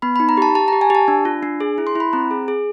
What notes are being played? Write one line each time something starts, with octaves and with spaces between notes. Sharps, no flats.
B3 B5
B5
D#4
A#5
G4 A5
G4 A5
A#5
G4
G#5
G4 A5
D4
F4
D4
G#4
E4
C6
E4 B5
C4 A#5
G#4
G#4